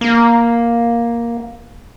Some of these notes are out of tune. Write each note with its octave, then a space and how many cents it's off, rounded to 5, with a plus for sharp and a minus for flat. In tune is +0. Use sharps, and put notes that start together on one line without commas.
A#3 +5